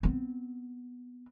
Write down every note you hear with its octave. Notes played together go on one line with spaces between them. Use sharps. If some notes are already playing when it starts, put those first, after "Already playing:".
B3 C4